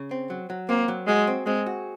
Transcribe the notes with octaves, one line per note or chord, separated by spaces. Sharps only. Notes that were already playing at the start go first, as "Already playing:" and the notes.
Already playing: C#3
C4
F#3
F#3
A#3 C4
F#3
G#3 F#4
C4
G#3 C4
F#4